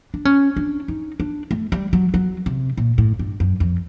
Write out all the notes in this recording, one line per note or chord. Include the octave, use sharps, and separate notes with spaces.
D4
C#4
D4
D#4
D4
A3
G3
F#3
F#3
C3
A#2
A2
G2
F#2
F2